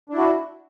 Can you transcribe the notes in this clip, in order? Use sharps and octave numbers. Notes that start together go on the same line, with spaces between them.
D4 E4 F#4